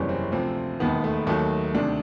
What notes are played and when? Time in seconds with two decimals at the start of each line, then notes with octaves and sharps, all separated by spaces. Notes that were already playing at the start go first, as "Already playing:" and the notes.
Already playing: F#1 E2 C3 E3 G3 C#4
0.09 C4
0.32 D2 C3 F3 C4
0.80 E1 D#2 D#3 B3
1.04 A3
1.27 D#2 D#3 F#3 A3
1.74 D2 C3 D#3 D4